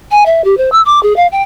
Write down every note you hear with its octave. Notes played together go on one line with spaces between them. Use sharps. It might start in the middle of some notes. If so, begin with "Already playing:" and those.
G#5
E5
G4
C5
E6
D6
G#4
F5
G5